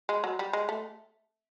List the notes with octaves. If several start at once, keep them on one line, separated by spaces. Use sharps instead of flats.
G#3
F#3
G3
G#3
A3